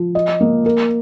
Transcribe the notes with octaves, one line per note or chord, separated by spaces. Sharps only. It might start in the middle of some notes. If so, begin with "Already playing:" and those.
Already playing: F3
D#5
A#3
A#4